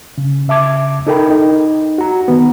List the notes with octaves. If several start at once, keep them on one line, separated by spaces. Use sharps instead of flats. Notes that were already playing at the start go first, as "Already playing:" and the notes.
C#3
C#3 E5 A5 D6 G#6
D#4 A4 A#4 G5 B5
D#4
F#4 A#5
D#3 B3